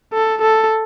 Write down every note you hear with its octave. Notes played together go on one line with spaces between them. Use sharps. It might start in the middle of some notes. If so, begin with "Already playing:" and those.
A4
A4